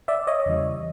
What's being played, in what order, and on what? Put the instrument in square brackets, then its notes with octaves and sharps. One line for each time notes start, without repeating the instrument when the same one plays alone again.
[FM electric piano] D5 E5
C#5 D#5
E2 C#3 E3 G3